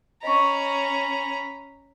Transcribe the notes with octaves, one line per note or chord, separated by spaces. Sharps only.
C#4 D#5 A#5 B5 C#6